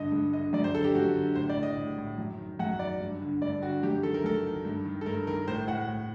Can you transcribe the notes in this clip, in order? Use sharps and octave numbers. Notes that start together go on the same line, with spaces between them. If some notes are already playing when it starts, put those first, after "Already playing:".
Already playing: G2 D3 D#5
G2
D3 D#5
F#2 D5
C5
D3 A4
G4
F#2 F#4
D3
A2 C5
D5
A2
D#5
A2
A2
F#2
D#3
F#2 F#5
D#3 D5
G2
D3
G2 D5
D3 F#4
F#2 G4
D#3 A4
A#4
F#2 A4
D#3
G2
D#3
A4
G2 A#4
D#3 A#4
A2 C5
A2 F#5
A2